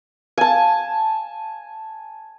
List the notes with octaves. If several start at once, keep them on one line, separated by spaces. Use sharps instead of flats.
G#5 A5